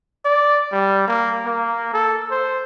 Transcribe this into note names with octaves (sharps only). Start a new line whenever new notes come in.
D5
G3
A#3
A#3
A4
C5